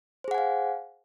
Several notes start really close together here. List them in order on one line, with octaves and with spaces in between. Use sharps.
C5 G#4 F#5 G#5 F5